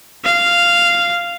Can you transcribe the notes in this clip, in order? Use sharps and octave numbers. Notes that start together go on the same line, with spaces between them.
F5